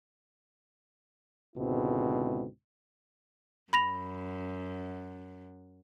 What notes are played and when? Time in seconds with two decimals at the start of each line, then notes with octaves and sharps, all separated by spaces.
1.57 C#2 G#2 B2 D3 C4 E4
3.73 F#2 B5 A#6 F7